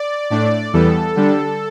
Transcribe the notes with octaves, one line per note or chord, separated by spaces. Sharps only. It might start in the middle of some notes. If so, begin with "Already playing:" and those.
Already playing: D5
A2 A3 D4 D5
E2 E3 G3 B3 A4
D3 G3 D4